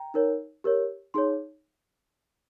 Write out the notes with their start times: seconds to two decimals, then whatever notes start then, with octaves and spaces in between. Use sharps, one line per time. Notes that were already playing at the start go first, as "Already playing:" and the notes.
Already playing: G5 A#5
0.14 D#4 A#4 C#5
0.64 G4 A#4 C#5
1.14 D#4 G#4 C#5 C6